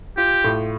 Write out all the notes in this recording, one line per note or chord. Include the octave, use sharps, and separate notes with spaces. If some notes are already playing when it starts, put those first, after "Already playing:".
F4 G4
A2